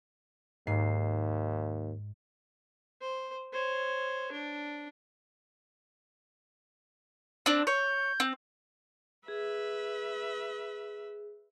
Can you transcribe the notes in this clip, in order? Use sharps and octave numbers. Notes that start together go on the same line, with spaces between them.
D#2 G#2 C7
C5
C5 C#5
D4
C4 D4
C#5 G6
C4
G#4 B4 E5